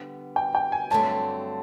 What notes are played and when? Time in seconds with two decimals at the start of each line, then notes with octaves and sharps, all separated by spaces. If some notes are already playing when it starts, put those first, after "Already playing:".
Already playing: D3 G3 B3
0.36 G5
0.55 G5
0.72 G#5
0.91 G2 D3 F#3 A3 C4 A5